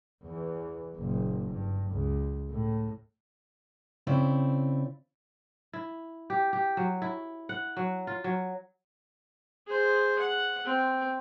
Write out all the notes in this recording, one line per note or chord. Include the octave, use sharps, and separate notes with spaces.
E2 E3
F#1 A#2
G2
C#2
A2
C#3 C4 E4 D5
E4
G4
G4
F#3
E4
F#5
F#3
F4
F#3
G#4 C5
F#5
C4